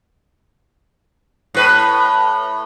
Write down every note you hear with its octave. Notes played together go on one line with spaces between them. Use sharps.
A2 B4